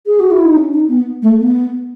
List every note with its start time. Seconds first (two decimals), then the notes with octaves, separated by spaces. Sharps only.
0.06 G#4
0.20 F#4
0.31 E4
0.44 D#4
0.56 C#4
0.73 D#4
0.89 B3
1.22 A3
1.39 B3